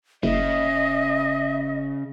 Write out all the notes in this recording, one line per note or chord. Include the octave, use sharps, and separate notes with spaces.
F#1 C#3 D#5 E5